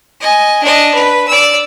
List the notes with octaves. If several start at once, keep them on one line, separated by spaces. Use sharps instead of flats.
D#5 G#5
D4 D#5
B4
D5 E6